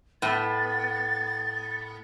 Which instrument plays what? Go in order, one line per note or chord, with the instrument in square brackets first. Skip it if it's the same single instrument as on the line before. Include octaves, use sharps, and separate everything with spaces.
[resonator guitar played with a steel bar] A2 B3 [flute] A6